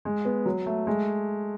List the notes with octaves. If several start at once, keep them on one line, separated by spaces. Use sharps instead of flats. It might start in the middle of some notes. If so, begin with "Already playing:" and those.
G#3
B3
F#3
A3
G#3